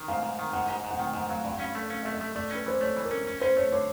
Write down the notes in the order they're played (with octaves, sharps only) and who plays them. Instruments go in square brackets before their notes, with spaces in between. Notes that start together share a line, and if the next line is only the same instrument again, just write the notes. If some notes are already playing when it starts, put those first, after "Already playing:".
Already playing: [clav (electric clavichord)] D#3
[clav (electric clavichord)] G#2 [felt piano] F5
[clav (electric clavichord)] G#2
D#3
[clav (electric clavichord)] G#2 [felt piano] F#5
[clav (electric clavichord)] G#2
G#2
[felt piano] F#5
[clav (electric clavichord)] D#3 [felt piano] G5
[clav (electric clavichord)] G#2 [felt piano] F#5
[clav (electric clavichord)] F#3 [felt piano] F5
[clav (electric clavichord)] G2 [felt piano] F5
[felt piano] F#5
[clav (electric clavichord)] C#4 [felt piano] F5
[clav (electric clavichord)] A3
[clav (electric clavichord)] C#4 [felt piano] F5
[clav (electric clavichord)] A3 [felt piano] E5
[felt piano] D#5
[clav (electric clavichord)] A3
[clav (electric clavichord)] A3 [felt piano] D5
[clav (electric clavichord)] C#4 [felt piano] B4
[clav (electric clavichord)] E3 [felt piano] C5
[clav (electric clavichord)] A3 [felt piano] C#5
[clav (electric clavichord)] E3
[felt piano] A#4
[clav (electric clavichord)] C#4
C#4
[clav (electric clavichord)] C#4 [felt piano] C5
[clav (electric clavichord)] A3 [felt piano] C#5
[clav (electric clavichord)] D3 [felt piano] C#5